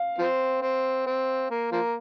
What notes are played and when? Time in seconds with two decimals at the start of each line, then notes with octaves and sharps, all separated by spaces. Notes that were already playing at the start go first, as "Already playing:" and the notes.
Already playing: F5
0.18 F3 C4
0.62 C4
1.06 C4
1.50 A#3
1.72 F3 A#3